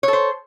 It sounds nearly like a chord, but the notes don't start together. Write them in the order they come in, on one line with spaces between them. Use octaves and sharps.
C#5 A4 C5